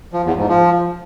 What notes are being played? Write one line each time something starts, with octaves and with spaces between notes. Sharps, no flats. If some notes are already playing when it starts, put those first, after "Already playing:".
F3
E2
G#2
F3